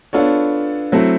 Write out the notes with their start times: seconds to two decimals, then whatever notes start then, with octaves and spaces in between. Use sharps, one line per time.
0.13 B3 D4 F4 A4 C#5
0.92 F#3 A3 C4 E4